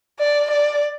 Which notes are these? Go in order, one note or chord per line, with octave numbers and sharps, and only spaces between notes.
D5
D5